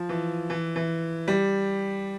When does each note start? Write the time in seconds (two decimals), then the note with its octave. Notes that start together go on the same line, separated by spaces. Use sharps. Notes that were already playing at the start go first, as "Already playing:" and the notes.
Already playing: F3
0.09 E3
0.50 E3
0.76 E3
1.28 G3